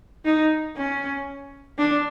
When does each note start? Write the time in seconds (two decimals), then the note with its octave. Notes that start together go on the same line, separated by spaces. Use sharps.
0.25 D#4
0.77 C#4
1.79 D4